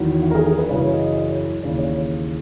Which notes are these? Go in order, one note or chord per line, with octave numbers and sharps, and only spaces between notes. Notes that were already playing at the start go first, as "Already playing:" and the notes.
Already playing: E2 D#3 F#3 E4
F#4
A#4
G#4
G#4
B4
F#2 C#3 E3 C#5
D#5
C#5
D#2 C#3 E3 C#5
C#5